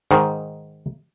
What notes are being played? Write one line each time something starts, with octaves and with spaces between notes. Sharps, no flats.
G#2 D#3